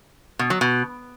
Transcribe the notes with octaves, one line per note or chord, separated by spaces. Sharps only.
B2
F#3
B2